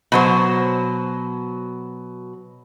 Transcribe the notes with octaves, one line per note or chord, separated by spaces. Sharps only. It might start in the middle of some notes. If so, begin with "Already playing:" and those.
B2 F#3 C5